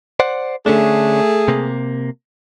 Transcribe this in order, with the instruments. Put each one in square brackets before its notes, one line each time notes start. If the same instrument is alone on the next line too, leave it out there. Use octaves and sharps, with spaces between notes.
[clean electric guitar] C5 D5 F#5
[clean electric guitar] D3 C#4 D4 [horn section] A3 G#4
[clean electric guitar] C3 A#3